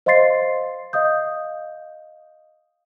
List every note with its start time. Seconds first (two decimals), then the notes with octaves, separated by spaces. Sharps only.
0.06 C5 D#5 F5 C6 A6 C7
0.93 D#5 F5 D#6 G6